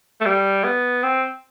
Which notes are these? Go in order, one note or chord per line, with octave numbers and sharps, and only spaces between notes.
A3
G3
B3
C4